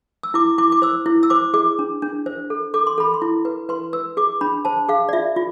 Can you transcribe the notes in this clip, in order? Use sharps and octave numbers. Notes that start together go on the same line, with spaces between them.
E6
E4 D6
E4 D6
D6
C5 E6
E4
E6
C5 D6
G#4 D6
D4
D4
C5
A4
A4 D6
C6
A4 B5
C6
E4
B4
B4 C6
B4 E6
G#4 D6
D4 B5
C5 A5
G#4 F5
D5
F4 E5
F4